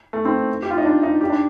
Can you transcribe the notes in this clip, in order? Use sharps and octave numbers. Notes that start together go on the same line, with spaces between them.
A3
C4
G4
F4
D#4
D4
D#4
G4
D4